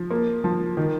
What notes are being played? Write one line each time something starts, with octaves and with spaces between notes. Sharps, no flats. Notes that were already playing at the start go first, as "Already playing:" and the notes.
Already playing: F3
A#3
F3
D#3